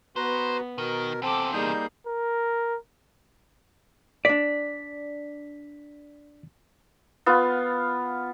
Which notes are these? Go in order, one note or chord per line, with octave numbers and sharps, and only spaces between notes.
B3 F#4 B4 C5 A#5
B2 D#3 A#4
E2 C3 C4 A4 D6
G3 A#3 D#4 G#4 G6
A#4
D4 D5 B6
B3 F4